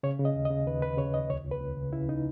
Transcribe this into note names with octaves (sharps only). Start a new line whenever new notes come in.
C#3 C#5
C#3
D#5
D#2
D#5
C#3
D#2 B4
D#2 B4
C#3 C#5
D#2 D#5
C#2 C#5
C#2
B4
C#2
C#3
C#3 E4
C#3 D#4